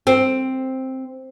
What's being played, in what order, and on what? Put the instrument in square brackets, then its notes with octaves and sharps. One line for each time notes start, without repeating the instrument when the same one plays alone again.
[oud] C4